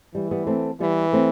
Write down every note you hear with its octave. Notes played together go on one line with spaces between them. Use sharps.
E3 G3
G3 B3
A3 C4
E3 G3 B3
A3 C4